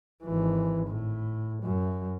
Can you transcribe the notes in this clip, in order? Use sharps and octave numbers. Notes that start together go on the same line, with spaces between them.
G#1 E3
A2
F#2